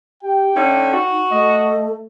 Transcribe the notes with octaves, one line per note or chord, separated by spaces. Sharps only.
G4 G5
D3 A3 C#4 D#4
F#4
A3 D#5